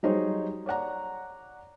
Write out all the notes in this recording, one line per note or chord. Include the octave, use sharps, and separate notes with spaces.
F#3 G3 D#4 G#4 C5 C#5
C#5 D5 F#5 A#5